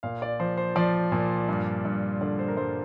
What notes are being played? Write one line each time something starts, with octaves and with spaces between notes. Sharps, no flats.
A#2 F5
D5
F3 C5
C5
F3 D5
A#2
G2
G2
D3 D5
C5
A#4
G2 C5